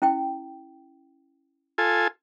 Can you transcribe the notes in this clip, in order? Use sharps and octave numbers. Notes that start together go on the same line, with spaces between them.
C#4 E4 G5
F4 A4 G#5